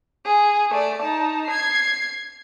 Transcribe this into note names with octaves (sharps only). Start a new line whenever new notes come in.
G#4
A3 D5
D#4 A5
G#6 C7